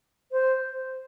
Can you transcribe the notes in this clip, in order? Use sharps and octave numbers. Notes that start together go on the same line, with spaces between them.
C5